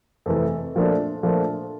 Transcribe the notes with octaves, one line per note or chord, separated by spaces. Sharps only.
F2 C3 E3 A3
A#2 F3 A3 D4
A#2 F3 A3 D4